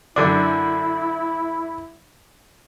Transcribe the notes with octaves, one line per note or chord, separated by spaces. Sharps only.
F#2 D3 D4 E4